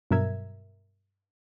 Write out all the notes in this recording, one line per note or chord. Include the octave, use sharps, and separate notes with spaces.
G2 B2 F#3 A#4 E5 G#6